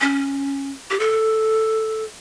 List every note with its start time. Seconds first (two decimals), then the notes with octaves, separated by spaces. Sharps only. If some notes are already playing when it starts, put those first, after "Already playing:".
0.01 C#4
0.91 G4
1.00 A4